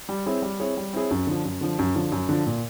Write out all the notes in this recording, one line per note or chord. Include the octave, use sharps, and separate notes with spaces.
G3
C4 E4 G#4 C#5
G3
C4 E4 G#4 C#5
G3
C4 E4 G#4 C#5
F#2
D3 F3
F#2
D3 F3
F#2
D3 F3
F#2
D3 F3
A#2